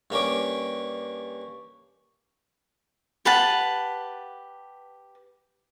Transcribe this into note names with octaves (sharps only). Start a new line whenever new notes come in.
G2 A#3 C#4 D6
G4 B4 F#5 A5